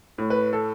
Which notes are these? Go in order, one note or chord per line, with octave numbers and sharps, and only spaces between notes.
A2
B4
A4